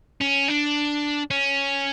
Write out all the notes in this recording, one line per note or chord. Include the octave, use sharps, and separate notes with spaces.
C#4
D4
C#4